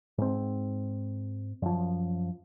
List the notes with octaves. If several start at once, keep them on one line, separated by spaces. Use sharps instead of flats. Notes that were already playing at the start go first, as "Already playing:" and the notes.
G#2 C4
F#2 F3